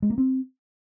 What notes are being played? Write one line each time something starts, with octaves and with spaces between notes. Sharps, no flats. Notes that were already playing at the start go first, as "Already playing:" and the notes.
G#3
A#3
C4